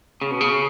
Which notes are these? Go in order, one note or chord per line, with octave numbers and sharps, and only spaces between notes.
C#3
B2
C#3